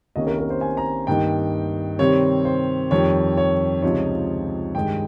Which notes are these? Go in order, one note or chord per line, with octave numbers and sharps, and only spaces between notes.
C2 C3 D#3 A#3 C#4 D#5
A#4
A#4
C5
G#5
A#5
G2 D#3 A#3 D#4 G5
C3 D#3 G3 C4 C#5
C5
F2 D#3 G3 C#5
C#5
C#2 C3 F3 C4 D#4 C#5
G2 D#3 G#3 G5